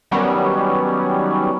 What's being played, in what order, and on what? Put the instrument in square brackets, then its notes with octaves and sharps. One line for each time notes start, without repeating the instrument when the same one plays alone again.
[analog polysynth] D#3 F#3 G3 B3 C#4